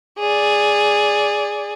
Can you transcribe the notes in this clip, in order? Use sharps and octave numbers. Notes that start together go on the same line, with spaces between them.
G#4 D5